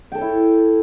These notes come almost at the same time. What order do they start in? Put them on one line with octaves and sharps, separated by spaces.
G5 A4 C#5 E4